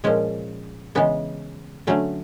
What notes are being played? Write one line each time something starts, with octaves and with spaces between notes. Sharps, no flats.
A#2 F3 G#3 C#4
C#3 E3 G#3 B3
D3 F#3 A3 C#4